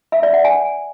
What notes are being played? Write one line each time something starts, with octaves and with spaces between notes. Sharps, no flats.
E5
D5
F#5
G#5